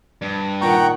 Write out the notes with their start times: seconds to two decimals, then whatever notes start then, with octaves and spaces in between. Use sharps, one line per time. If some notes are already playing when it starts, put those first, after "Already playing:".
0.22 G2
0.61 A#2 D#3 F#5 G5 A#5 C#6